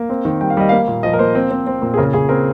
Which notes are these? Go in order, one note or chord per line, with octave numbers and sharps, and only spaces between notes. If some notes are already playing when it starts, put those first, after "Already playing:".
Already playing: A#3
C4
D#3
G3 G5
F5
G3 D#5
A#3 F5
A#2
F3 D#5
A#4
A#3 C5
C4
C4
C4
A#2
G#4
C#3 A#4
C#3 G#4
C4 A#4